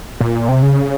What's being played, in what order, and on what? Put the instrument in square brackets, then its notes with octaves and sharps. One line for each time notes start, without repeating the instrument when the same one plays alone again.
[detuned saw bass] A#2
C3
C#3